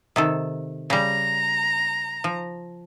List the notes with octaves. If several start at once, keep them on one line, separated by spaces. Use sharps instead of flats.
C3 D#3 A4
C#3 G3 A#5
F3